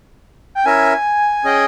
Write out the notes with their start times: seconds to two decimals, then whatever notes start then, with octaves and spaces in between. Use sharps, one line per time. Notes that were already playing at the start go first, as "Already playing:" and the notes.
0.55 G5
0.66 C#4 E4 A#4 E5 G#5
1.44 C#4 G#4 D#5 G5